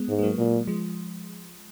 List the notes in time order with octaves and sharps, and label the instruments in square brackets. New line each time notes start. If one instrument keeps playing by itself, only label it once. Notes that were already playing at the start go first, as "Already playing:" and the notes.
Already playing: [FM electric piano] G#3 B3
[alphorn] G#2
[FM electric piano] G#3
F#3 A#3
[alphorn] A#2
[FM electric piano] F3 G#3